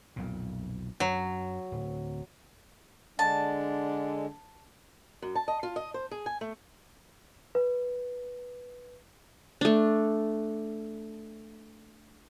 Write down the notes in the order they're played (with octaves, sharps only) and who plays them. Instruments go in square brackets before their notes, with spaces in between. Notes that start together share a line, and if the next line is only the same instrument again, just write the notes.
[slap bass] B1 F2 A#2
[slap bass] F#2 [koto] F#3
[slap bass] D1
[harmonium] D3 G#3 [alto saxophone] D4 [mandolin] A5
[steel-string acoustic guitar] F#2
A5
D#5
F4
D#5
C5
G#4
G#5
A3
[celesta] B4
[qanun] A3 D4